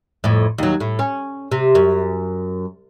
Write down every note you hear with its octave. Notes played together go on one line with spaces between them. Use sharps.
F2 A2
D#2 F#3
A2
C#4
C3
F#2